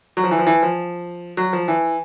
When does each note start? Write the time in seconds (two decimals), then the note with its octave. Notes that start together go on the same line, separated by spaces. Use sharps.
0.17 F#3
0.24 F3
0.31 E3
0.39 F3
0.47 E3
0.63 F3
1.37 F#3
1.53 F3
1.68 E3